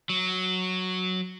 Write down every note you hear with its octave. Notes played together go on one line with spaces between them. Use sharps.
F#3